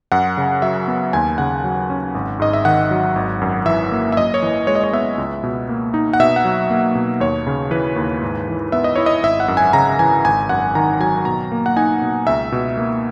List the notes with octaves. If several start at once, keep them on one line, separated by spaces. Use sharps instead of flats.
F#2 F#5
C#3
F#3 E5
B3
D#2 G#5
C#3 F#5
F#3
C#4
G#1
G#2 D#5
E5
D#3 F#5
F#3
G#1
F#2
E3 E5
A#3
E5
F#2 D#5
C#5
E3
G#3 C#5
D#5
C#5
B3 E5
C#2
B2
A#3
D#4
F#5
B2 E5
F#5
F#3
A#3
B2
D#2 C#5
C#3
E3 B4
D#2
G#2
E3
B3 E5
D#5
E4 C#5
D#5
G#1 E5
F#5
F#2
G#5
C#3 A#5
E3 G#5
G#1 G#5
F#2 F#5
D#3 A#5
F#3 G#5
B2 A#5
A#3
F#5
D#4 G#5
B2
C#2 E5
B2
A#3